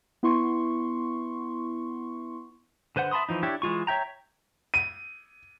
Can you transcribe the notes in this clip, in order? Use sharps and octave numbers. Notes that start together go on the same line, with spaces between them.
B3 E4 C6 C#6
D3 B4 C5 F#5
E5 A5 B5 C6 D#6
E3 F3 D#4
D4 E4 G4 C#5
E3 G#3 F4 C#6
C#5 E5 G5 A#5
D#7